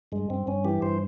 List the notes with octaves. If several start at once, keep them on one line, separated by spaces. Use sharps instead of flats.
G2 G#3
G2 C4
G2 C#4
E3 G4
G2 C5